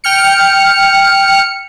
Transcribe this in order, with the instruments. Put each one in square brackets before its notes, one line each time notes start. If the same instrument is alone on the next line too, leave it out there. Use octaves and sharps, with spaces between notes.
[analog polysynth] G5 F6 C#7